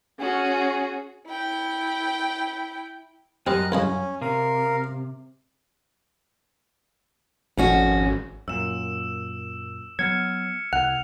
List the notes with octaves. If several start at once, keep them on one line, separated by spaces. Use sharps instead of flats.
C#4 F#4 G#4
E4 G5
F#2 G3 C4 D#5 F6 F#6
C2 C#3 C#4 D#5
C3 A#4 F5
G#1 F2 C#4 F#4
F#2 A#2 E6 E7
F#3 B3 F6 G#6 C#7
C2 F#5 F7